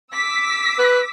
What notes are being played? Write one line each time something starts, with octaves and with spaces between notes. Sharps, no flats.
D6 E6 B6
B4